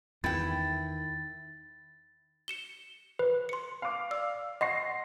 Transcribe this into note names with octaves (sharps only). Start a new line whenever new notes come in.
E2 D#3 E4 G5 A6
C#7 E7 G7
B4
C6 C#7
F5 D6
D5 E6
D#5 F#5 C6 C#6 A#6 C7